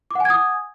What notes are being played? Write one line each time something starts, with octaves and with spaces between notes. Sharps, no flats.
F#5 G#5 D6 D#6 G#6